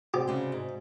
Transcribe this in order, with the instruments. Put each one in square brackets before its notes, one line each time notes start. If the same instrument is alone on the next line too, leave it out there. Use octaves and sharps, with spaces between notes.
[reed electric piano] A2 C3 [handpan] F#4 C5 D5 [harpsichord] G4
[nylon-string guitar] C#3 G#3
G#2